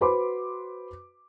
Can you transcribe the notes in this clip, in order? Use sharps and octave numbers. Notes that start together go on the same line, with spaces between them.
F#4 B4 C5 B5 C6 D6